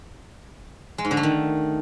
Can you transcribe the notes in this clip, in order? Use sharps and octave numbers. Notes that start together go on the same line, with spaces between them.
G#3
G#2
D3
A3
D#3